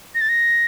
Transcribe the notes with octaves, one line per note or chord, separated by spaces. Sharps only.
A#6
A6
A#6